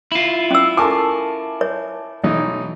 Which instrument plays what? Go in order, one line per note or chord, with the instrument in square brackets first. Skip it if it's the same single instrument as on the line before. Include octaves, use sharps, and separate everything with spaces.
[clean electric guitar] E4 F4
[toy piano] C#4 E6
[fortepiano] A4 A#4 C#6 [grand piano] G#5 A5 D6
[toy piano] C#5
[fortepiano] B1 E3 D#4